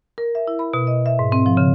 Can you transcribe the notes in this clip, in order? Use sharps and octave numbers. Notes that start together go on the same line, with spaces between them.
A#4
E5
E4
B5
B2
D#5
E5
G#2
C4
F3
C#3